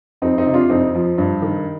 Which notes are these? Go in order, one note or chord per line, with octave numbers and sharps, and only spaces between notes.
F2 C4 D#4
C4 D#4
C3
D4 F4
F2 C4 D#4
F3
G2
D#3